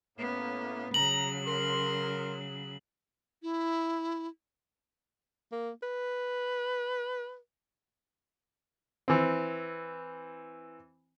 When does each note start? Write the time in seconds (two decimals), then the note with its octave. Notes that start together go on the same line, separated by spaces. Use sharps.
0.18 A2 A#3 B3 C#4
0.94 C#3 F#3 A#5 F#7
1.47 A#4 C6
3.43 E4
5.52 A#3
5.83 B4
9.08 E3 C4